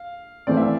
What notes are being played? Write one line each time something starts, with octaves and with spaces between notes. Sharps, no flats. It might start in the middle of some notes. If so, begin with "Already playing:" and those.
Already playing: F5
E3 A3 C4 D5
E5